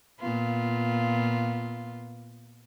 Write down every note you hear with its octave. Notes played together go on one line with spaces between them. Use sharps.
A#2 B3 F4